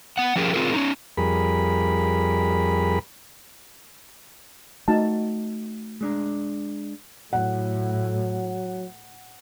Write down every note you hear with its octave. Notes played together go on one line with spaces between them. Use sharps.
B3 F#5
F3 C#4 G4 G#4 A#4
C4 F4 G#4 A#4
C#4 D#4
F2 G3 G#4 A#4 B5
A3 D#4 F#4 A5
G#3 D4 A#5
A2 F#3 F#5